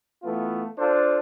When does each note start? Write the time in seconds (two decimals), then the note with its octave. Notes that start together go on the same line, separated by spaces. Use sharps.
0.23 E3 A3 B3 F4
0.78 D4 F4 A4 C5